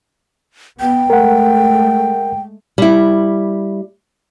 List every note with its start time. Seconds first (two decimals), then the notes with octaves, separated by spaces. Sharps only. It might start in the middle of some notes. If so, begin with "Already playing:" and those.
0.80 B3 G5
1.10 G#3 A3 A#4 F#5
2.78 G3 E4